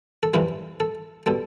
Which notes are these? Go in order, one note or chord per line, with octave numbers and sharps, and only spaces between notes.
A4
F2 C3 E3 G3 B4
A4
B2 G3 A4